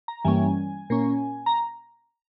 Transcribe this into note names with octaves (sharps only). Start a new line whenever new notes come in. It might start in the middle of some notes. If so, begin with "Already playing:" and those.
A#5
G2 E3 G3 A#3 C#4 G#5
A#2 A#3 C#4
A#5